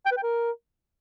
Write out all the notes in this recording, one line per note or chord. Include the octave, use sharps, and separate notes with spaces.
G5
B4
G5
A#4